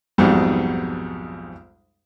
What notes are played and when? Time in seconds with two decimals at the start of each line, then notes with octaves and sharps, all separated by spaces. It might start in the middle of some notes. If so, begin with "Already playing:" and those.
0.18 B1 F2 G#2 B2 G3